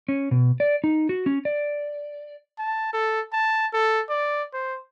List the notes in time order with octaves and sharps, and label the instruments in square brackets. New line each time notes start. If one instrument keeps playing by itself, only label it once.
[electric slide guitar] C#4
B2
D5
D#4
F#4
C#4
D5
[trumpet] A5
A4
A5
A4
D5
C5